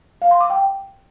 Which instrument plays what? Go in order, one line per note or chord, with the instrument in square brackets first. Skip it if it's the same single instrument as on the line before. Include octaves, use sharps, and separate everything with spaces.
[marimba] F5
C6
D6
G5